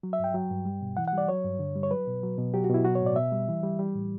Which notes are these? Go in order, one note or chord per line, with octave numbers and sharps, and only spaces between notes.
F#3
E5
G2 G5
F#3
G2
G3
B2
E3 F#5
F#5
G3 D5
F#3 C#5
G2
D3
G3
C#5
F#3 B4
B2
F#3
B2
F#3 G4
F#4
B2
E4
F#3 F#4
C#5
A2 D5
B2 E5
G3
E3
G3
G3
A2